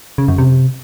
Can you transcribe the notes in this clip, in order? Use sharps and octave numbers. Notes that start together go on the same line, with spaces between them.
C#3
F#2
C3